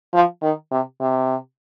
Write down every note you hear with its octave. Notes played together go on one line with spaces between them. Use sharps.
F3
D#3
C3
C3